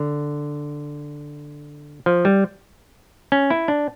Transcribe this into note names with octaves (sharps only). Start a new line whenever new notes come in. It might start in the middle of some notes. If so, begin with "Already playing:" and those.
Already playing: D3
F3
G3
C#4
E4
D4